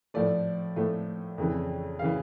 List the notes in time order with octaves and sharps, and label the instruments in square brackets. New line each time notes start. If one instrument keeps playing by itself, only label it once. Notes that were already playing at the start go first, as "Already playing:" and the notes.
[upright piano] A2 F3 A3 D5
A2 F3 A3
F2 C#3 E3
C#3 E3 F5